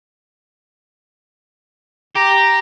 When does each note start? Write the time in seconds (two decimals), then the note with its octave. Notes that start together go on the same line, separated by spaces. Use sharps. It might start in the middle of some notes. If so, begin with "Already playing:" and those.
2.16 G4 A#5